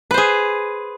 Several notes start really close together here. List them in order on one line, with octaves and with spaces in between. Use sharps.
B4 C5 G#4